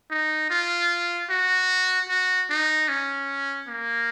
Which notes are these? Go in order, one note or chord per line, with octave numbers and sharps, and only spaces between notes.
D#4
F4
F#4
F#4
D#4
C#4
A#3